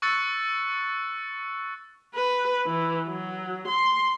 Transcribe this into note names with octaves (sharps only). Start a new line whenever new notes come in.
C#6 E6 F#6 A6 C#7
B4
E3
F#3
C6